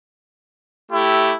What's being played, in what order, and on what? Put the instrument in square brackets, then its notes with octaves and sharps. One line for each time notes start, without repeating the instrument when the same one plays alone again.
[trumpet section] A3 E4 G4